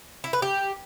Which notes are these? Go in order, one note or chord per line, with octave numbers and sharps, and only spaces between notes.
E4
B4
G4